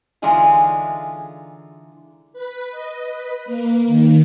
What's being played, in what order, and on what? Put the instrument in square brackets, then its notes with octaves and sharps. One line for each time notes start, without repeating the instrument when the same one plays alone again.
[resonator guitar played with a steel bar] D3 E3 G#3 D#4 F4 G#4
[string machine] B4
D#5
B4
A#3
D#3